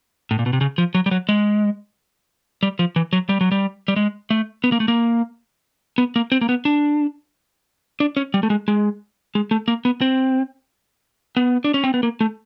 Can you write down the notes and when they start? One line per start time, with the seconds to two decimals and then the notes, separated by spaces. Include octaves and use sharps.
0.31 A2
0.39 A#2
0.46 B2
0.53 C3
0.61 C#3
0.78 F3
0.95 F#3
1.06 G3
1.11 F#3
1.29 G#3
2.63 G3
2.79 F3
2.96 E3
3.13 F#3
3.29 G3
3.41 F#3
3.52 G3
3.88 G3
3.96 G#3
4.30 A3
4.64 B3
4.72 A#3
4.80 A3
4.88 A#3
5.98 B3
6.16 A#3
6.32 C4
6.41 A#3
6.49 B3
6.65 D4
8.00 D4
8.17 C#4
8.34 G3
8.43 A3
8.50 G#3
8.68 G#3
9.35 G#3
9.51 A3
9.68 A#3
9.85 B3
10.01 C4
11.37 B3
11.64 D4
11.74 C#4
11.84 C4
11.94 B3
12.03 A#3
12.21 A3